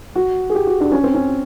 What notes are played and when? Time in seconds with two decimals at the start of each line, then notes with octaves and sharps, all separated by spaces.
0.16 F#4
0.49 G#4
0.55 G4
0.67 F#4
0.81 D4
0.92 C#4
1.03 C4
1.14 C#4